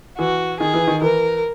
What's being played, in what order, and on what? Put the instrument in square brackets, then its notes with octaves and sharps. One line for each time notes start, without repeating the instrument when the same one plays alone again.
[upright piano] E3 [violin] F#4
[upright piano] D#3 [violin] G#4
[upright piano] E3
D#3
[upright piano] E3 [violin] A#4